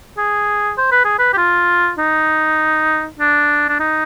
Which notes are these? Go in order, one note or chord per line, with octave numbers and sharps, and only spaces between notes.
G#4
C5
B4
G#4
B4
G4
F4
D#4
D4
D4
D#4